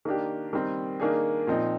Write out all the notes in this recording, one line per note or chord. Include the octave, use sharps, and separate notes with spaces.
D#3 A#3 D4 G4
D#3 G3 C4
D#3 A#3 D4 G#4
A#2 F3 C4 D#4